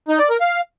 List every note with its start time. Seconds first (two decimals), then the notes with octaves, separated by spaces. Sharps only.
0.08 D#4
0.19 D5
0.30 A#4
0.41 F5